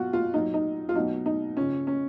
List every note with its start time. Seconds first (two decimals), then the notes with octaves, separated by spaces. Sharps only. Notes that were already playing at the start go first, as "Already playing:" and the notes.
Already playing: B2 F#3 F4 F#4
0.13 F4
0.34 A#2 F#3 D#4
0.54 D#4
0.89 F4
0.95 B2 F#3 D#4
1.26 D#4
1.57 C#3 F3 C#4
1.87 C#4